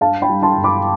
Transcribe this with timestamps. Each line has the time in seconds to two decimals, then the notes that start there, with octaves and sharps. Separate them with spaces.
0.01 G2 F5 A5
0.22 G5 B5
0.29 G3
0.42 A5 C6
0.57 G1
0.64 B5 D6